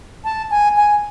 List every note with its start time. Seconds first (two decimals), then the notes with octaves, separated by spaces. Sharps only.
0.24 A5
0.50 G#5
0.76 G#5